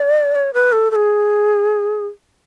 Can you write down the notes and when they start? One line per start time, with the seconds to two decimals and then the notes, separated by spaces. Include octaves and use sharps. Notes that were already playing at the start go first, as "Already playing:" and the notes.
Already playing: D5
0.35 C#5
0.54 B4
0.72 A4
0.91 A4
0.96 G#4